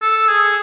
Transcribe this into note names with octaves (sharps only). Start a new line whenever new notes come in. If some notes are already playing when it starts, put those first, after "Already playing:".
A4
G#4